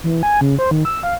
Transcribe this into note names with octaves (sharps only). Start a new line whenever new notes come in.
E3
G#5
C#3
C5
D#3
E6
F5